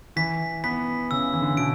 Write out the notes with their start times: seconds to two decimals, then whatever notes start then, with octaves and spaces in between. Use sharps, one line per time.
0.16 E3 B6
0.64 B3 B6
1.11 C#3 E6
1.33 E3
1.42 D3
1.50 C#3
1.57 B2 D7